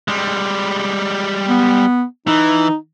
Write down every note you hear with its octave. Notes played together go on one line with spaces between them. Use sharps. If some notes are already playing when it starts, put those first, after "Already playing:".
G3 G#3
B3
E3 D#4